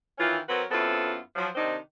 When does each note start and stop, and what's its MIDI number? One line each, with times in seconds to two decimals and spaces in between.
0.19 0.37 51
0.19 0.37 52
0.19 0.37 61
0.19 0.37 64
0.19 0.37 65
0.49 0.63 54
0.49 0.63 60
0.49 0.63 66
0.49 0.63 70
0.49 0.63 71
0.71 1.18 42
0.71 1.18 59
0.71 1.18 60
0.71 1.18 64
0.71 1.18 65
0.71 1.18 69
1.36 1.48 53
1.36 1.48 54
1.55 1.76 48
1.55 1.76 51
1.55 1.76 60
1.55 1.76 62
1.55 1.76 63